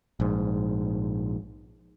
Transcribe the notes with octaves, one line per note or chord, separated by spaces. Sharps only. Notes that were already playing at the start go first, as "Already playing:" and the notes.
A#1 G#2